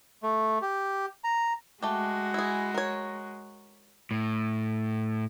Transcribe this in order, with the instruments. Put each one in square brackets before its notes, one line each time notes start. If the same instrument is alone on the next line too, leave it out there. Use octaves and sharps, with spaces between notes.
[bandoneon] A3
G4
A#5
[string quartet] G#3 F#4 [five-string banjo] A3 G4
[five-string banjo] E4 G#4
A#4 C#5
[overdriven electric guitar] A2